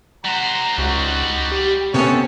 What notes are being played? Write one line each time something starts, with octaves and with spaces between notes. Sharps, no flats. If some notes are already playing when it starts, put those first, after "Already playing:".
G3 C5 F#5 A#5
C#2 D#4 F#4
G4
C3 B3 C#4 A4 C5 C#5